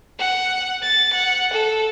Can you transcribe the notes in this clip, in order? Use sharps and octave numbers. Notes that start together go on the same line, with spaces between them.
F#5
A6
F#5
A4